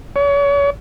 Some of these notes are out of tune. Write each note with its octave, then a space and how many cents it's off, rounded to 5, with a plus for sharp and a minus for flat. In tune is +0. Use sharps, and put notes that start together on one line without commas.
C#5 +35